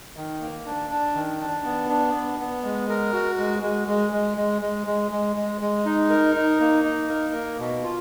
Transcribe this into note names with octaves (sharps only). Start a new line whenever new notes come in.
D#3
A#3
D4
D4
D#3
D4
B3
D4
B3
B3
G#3
A#4
F#4
G#3
G#3
G#3
G#3
G#3
G#3
G#3
G#3
G#3
G#3
D#4
A#4
D#4
A#3
D#4
A#4
A#3
B2
F4